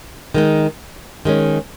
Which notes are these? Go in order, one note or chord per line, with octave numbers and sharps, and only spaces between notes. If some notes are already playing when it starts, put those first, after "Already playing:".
D#3 G#3 D#4
D#3 G#3 C#4